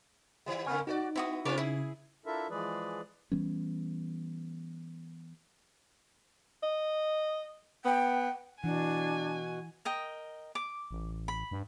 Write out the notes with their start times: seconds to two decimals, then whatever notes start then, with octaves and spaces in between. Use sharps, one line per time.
0.46 D#3 G3
0.66 C#3 A#3 C4 G#5 C#6 F6
0.87 D#4 F#4 A4 D5
1.16 B3 E4 F#4 D#6
1.45 C#3 C4 C#4 F4 B4 C#5 D5
1.58 E4 G#4
2.26 D4 E4 F4 A4 A#4 E5
2.50 E3 F3 G#3 G#4 B4 D5
3.32 E3 G3 B3 C#4
6.63 D#5
7.85 B3 G5
8.64 B2 E3 D4 F#5 G#5
9.85 A#4 D#5 G5
10.55 D6
10.91 A1
11.28 B5
11.51 G2